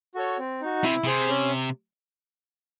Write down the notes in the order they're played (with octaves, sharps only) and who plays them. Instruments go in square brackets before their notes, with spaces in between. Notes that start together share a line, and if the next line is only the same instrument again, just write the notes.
[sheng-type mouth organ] F#4 A4 C#5
C4
D#4 F#4
[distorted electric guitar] C3 [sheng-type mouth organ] E4
[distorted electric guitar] C3 [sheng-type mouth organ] G#4 C5
[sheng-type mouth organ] C#4